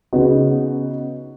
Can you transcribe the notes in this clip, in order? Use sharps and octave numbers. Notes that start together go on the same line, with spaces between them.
C#3 B3 D#4 F#4